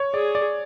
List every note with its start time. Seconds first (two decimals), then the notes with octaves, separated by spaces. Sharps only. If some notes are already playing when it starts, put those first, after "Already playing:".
Already playing: C#5
0.14 G#4 D5
0.35 D5